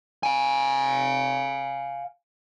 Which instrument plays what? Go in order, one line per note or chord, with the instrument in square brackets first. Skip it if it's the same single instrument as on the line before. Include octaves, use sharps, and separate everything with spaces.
[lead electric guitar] F5 G#5